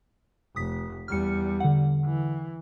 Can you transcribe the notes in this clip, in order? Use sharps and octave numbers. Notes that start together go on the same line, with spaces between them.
F1 D#6 B6
E2 G3 F6 C#7
D3 F#5
E3